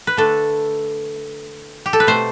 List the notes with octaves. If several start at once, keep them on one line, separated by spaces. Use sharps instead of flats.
B4
D3 A3 D4 A4
G4
A4
B4
B2 A3 C4 C5